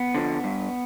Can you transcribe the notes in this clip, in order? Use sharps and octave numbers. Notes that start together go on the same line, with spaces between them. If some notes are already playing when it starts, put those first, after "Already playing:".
Already playing: B3
D3 F3
G2